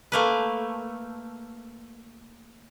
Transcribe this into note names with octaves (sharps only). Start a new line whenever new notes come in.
A3 A#3 B4